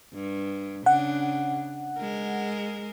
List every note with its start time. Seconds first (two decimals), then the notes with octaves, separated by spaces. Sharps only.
0.14 G2
0.86 C#3 D4 F#5
1.98 G#3 A#4